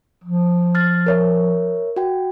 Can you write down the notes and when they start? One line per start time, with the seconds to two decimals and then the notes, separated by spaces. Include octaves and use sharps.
0.24 F3
0.75 F6 A6
1.06 A#4 C#5 E5
1.96 F#4 G5